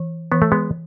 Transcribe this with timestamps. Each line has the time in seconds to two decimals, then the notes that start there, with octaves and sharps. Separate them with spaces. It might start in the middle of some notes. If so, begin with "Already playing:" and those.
Already playing: E3
0.32 E3 B3
0.42 A3
0.52 G#3 B3